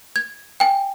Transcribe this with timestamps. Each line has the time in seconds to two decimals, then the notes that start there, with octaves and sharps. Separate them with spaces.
0.16 G#6
0.60 G5 G#5